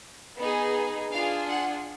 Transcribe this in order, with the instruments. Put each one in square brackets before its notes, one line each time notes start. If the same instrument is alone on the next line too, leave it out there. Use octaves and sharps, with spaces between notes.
[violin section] B3 D#4 G#4
D4 F4 G#4 F5
F#5